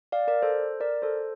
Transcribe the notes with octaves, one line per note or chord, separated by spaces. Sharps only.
D5 F5
A#4 D5
A4 C5
A#4 D5
A4 C5